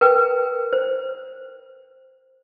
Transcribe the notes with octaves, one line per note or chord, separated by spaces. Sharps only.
A#4 B4 G5
C5